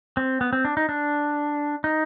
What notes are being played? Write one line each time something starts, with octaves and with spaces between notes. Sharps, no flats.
C4
B3
C4
D4
D#4
D4
D#4